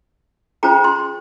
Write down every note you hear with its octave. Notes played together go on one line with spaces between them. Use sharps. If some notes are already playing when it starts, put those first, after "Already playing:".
C#4 F4 G#4 C5 A#5
C6